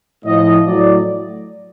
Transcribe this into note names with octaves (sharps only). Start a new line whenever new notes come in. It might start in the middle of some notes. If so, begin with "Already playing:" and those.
A2 F3 D#5
A2 F#3 D5